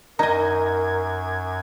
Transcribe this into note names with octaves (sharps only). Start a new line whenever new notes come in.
F#2 D#4 A#4 D#5 A#5 G#6